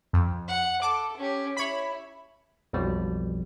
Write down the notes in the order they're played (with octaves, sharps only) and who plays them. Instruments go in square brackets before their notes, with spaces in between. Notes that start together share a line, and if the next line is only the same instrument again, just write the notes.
[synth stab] F2
[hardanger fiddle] F#5
[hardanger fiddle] A4 [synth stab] D6
[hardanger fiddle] C#4 G4
[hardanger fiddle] E4 [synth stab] C#5 B5
[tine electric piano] B1 F2 B2 F3 G3